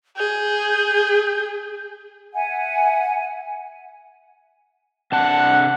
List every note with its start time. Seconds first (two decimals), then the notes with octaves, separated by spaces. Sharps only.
0.17 G#4 G6
2.34 E5 F#5 G#5
5.12 C3 D4 F#5 A5